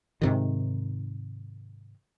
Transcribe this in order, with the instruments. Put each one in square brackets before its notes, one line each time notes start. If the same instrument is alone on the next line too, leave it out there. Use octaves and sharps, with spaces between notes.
[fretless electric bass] G#2 C3 D#3